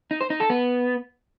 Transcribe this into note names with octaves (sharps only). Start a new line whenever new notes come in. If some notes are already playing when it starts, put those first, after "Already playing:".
D#4
C5
D#4
A4
B3